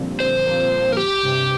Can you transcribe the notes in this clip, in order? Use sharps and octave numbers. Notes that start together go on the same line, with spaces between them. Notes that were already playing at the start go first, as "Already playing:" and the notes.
Already playing: A#2 D3 F3 G3 A#3 C4
A#3
D3 G3 C5
F3 A#3
F3 A#3
A#4
G4
G2 C3